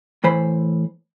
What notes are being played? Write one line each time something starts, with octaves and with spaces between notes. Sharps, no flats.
A2 E3 C5 B5